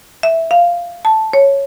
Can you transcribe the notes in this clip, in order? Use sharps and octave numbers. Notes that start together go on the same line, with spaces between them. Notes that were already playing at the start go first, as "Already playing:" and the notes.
E5
F5
A5
C#5